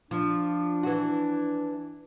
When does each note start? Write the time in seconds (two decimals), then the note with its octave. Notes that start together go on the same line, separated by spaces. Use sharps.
0.11 F3 D4
0.83 E3 F#4